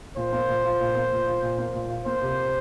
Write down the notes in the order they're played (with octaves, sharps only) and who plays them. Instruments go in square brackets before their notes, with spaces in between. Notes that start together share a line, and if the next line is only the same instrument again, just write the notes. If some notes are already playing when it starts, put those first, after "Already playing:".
[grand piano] A#2 [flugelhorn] C5
[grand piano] A#3
A#2
F4
A#2
A#3
A#2
F4
A#2
A#3
A#2
F4
[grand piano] A#3 [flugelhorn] C5
[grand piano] C3